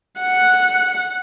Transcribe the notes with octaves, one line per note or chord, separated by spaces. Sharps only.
F#5